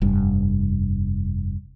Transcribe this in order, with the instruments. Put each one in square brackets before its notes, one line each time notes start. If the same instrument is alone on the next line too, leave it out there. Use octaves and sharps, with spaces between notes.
[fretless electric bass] F1 G2